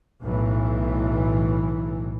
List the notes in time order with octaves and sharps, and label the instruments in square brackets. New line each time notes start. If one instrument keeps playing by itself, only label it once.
[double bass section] B1 A2 E3